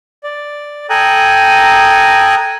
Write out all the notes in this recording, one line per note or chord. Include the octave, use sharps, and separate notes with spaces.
D5
A4 G5 G#5 A#5 D#6 F#6